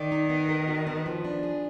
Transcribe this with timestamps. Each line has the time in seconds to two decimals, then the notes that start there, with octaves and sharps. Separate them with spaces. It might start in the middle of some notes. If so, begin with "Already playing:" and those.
Already playing: D#3 D5
0.12 D#4
0.30 B3
0.49 A#4
0.68 F#4
0.87 B3
1.06 F3
1.24 D4
1.43 G#4